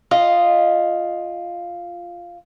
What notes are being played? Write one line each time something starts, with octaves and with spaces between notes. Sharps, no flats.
F4 D#5